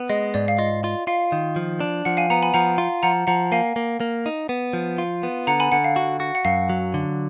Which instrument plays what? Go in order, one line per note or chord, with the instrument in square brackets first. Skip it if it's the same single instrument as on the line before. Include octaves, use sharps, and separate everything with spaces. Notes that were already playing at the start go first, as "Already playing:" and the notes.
Already playing: [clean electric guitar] B3
[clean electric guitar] G#3 [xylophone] D#5
[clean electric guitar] G#2 [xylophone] D5
[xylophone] F5
[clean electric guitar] F4 [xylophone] D#5
[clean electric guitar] F4
[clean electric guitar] F4 [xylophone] F5
[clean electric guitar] D#3
F3
D4
[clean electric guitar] F3 [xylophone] F#5
[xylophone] F5 G#5
[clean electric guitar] B3 [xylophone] F#5 A#5
[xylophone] G#5 B5
[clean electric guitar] F3 [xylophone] F#5 A#5
[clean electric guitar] F4
[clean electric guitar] F3 [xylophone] F#5 A#5
[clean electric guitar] F3 [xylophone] F#5 A#5
[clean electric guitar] A#3 [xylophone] F5 G#5
[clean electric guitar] A#3
A#3
D#4
B3
F3
F4
B3
[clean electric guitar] D3 [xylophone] F#5 A#5
[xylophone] G#5 B5
[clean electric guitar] D3 [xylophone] F#5
[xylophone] F5
[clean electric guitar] F#4
F#4
[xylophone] F#5
[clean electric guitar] F#2 [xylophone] F5
[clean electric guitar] F#3
D3